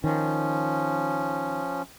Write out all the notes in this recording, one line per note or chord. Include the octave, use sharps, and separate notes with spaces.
D#3 F3 C#4